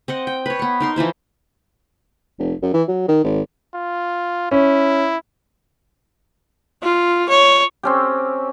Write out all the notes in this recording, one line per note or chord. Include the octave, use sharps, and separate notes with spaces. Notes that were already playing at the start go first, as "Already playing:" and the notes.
C4 D#5 F#5
G5
B4 C#5
B3 C#6
D#4 A#4 C6
E3 F3 E4 C5
F1
F#2
E3
F#3
D#3
G#1
F4
C#4 E4
F4
C#5
C4 C#4 G4